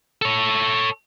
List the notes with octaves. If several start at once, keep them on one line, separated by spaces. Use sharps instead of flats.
A4 C#5